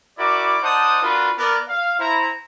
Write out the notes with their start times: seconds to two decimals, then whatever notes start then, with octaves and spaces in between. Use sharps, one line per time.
0.19 E4 F#4 A#4 D5 D6
0.62 D#4 C5 D5 F#5 A5 D#6
1.02 D4 F4 F#4 A#4 B4
1.38 B3 A#4 D5
1.69 F5
1.99 E4 C5 A#5